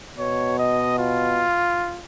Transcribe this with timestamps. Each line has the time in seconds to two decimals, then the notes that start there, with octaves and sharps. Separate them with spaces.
0.18 B2 C#5
0.59 D#5
0.99 F4